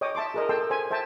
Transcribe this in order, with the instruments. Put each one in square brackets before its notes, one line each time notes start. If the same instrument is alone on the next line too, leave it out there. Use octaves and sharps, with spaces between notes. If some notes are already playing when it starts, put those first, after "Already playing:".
[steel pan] C#5 D#5 G5 D6 D#6
E5 A5 C6 D6
G#4 A#4 D#5
A4 G5 A5 C6 E6
C5 G#5
C5 E5 G5 A5